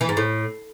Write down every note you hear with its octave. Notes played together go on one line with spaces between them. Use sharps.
E3
G#2
A2